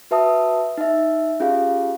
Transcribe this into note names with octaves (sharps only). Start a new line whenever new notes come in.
F#4 B4 E5 A5 D#6
D#4 E5
C#4 F4 G4 G#4 F5